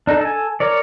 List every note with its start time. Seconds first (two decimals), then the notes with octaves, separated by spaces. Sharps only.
0.07 D4 D#4 A4
0.21 A4 G#5
0.60 A#4 C#5 D5